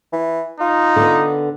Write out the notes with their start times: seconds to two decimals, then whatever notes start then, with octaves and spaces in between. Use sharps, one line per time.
0.13 E3
0.60 D#4 F4
0.96 D3 B3